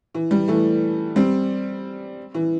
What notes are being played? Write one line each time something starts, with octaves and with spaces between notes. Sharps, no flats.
E3
G3
E3 A3
G3 C4
E3